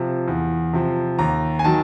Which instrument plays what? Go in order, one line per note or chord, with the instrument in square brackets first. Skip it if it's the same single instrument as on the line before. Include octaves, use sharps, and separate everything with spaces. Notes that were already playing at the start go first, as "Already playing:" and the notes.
Already playing: [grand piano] C3 F3 F5
E2
C3 F3
D#2 A#5
G#5
D#3 F#3 A5